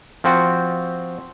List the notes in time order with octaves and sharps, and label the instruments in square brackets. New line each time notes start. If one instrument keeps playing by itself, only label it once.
[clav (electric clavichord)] F3 C4 F#4